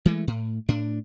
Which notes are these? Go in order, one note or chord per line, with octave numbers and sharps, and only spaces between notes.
E3 G#3 A3
A2
A2 D4